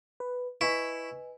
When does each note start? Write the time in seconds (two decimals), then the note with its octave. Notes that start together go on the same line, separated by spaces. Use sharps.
0.20 B4
0.61 E4 B4 D#5 G#5 C#6 B6